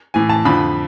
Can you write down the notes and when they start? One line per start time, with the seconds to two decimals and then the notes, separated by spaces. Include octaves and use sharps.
0.14 A2 E3 G#5
0.29 A5
0.45 F2 D3 F3 B5